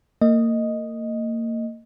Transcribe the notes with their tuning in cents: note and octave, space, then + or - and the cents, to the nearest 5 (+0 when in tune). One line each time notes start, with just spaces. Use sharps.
A#3 -30 D#5 +0